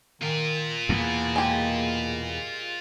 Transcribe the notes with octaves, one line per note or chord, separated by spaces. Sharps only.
D#3 F4 A#4
E2 B2 A#3
G#3 G4